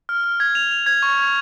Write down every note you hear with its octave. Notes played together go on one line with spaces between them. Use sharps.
F6
F6
G#6
F7
F7
G#6
C#6
G#6